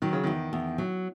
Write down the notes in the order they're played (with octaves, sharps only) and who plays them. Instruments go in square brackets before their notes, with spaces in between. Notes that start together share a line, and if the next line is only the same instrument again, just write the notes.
[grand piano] D#3 [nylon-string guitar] F#3
[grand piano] C#3
[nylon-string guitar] E2 [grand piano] D#3
[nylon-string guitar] E2
F#3